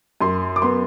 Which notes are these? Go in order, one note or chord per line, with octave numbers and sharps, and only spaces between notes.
F#2 C6
D6
B3 C6